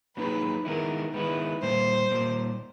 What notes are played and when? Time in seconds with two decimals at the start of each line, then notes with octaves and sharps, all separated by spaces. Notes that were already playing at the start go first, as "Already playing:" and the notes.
0.16 F#3 A#3 D#4 G#4 B4
0.65 D#3 G#3 B3 E4 A#4
1.13 D#3 G#3 B3 E4 B4
1.61 A#2 G3 A#3 C5
2.11 A#2 G3 A#3